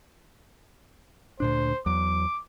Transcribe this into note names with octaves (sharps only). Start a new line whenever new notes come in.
D2 A#2 D4 C5
E2 F#3 D6